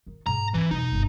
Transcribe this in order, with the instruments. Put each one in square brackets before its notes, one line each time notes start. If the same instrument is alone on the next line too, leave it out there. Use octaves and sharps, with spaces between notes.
[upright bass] D#3
[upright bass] G#2 [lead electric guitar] A#5
[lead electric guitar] E3 [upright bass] C4
[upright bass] E1 F#2 [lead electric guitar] D#4
[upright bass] G1 D#2